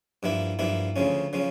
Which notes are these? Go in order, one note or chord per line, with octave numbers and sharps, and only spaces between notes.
G2 F3 A#3 E4
G2 F3 A#3 E4
D2 C#3 F3 C#4
C#3 F3 C#4